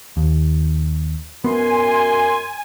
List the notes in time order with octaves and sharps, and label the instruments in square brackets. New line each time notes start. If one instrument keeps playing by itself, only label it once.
[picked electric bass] D#2
[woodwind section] F#2 C6 [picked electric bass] B3 [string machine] G#5